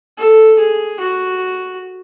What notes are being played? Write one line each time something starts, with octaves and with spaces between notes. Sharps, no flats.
A4
G#4
F#4